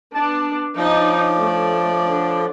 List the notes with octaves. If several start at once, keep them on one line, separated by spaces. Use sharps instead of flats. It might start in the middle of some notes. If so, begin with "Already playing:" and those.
B3 D4 A5
F3 D4 D#4 C#5 D5
A3
D3